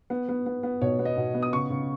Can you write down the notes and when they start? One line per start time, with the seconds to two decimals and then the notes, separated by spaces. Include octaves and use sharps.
0.10 B3
0.29 B3
0.46 B3
0.63 B3
0.81 B2 C#5
0.99 B3
1.05 D#5
1.17 B2
1.34 B3
1.43 D#6
1.53 C#3 C#6
1.70 C#3